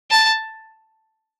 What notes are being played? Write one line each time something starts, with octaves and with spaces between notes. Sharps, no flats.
A5